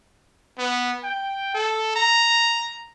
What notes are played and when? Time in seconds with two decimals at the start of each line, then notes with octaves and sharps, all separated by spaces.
0.58 B3
1.04 G5
1.54 A4
1.96 A#5